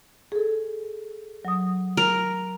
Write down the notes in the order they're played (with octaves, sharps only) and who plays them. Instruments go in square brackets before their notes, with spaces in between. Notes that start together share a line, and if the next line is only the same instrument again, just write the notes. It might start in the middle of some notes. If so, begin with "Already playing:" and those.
[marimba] G#4 A4
F#3 D#6
[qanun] A#4